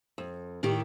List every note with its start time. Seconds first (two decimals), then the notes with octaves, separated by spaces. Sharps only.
0.18 F2
0.63 A2 D#3 E4 G4